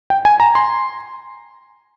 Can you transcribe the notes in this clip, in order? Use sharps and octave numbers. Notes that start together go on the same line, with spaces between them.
G5
G#5
A#5
C6